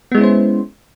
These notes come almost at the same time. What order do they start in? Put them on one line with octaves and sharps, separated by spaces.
B3 G#3 E4 C#4 C5